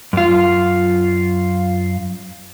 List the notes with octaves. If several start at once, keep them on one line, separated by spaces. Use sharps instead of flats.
F#2 F4